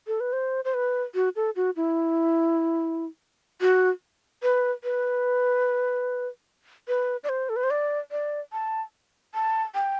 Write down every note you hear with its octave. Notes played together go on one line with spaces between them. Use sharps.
A4
B4
C5
C5
B4
F#4
A4
F#4
E4
F#4
B4
B4
B4
D5
C5
A4
B4
C5
D5
D5
A5
A5
G5